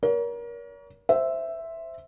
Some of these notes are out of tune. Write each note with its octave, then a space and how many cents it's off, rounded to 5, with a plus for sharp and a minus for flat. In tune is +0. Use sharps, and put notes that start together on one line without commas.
A#4 +30 C#5 +40
C5 +0 E5 +0